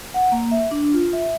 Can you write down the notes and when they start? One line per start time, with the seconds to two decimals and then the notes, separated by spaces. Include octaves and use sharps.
0.14 F#5
0.32 A#3
0.51 E5
0.71 D4
0.93 F4
1.13 E5